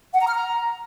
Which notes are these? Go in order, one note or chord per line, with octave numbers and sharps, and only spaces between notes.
F#5
A#5
F6
A#5